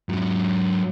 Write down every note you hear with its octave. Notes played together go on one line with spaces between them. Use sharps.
G#2 F#3